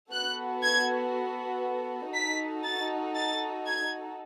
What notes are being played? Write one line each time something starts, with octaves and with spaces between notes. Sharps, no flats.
B3 F#4 A4 F#6
G#6
D#4 F#4 A4 B6
A6
A6
G#6